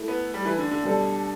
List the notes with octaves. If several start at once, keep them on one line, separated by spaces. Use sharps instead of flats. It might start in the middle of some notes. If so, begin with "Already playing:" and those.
Already playing: A3 E4 A4
B3
G3
E3
D3
D3
B2 G3 D4 A4